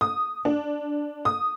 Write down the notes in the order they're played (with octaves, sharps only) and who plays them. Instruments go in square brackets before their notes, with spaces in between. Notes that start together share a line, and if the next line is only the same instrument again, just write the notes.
[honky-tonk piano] D#6
D4
D#6